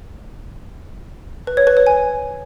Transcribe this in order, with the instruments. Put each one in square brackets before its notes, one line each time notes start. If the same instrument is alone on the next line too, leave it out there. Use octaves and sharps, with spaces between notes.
[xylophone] B4
C#5
B4
C#5
G#5